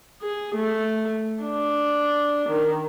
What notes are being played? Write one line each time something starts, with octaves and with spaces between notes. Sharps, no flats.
G#4
A3
D4
D#3